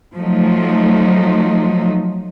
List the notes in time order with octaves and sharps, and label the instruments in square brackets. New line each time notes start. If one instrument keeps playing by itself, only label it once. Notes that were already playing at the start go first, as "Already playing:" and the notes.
[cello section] F3 F#3 A3 D#4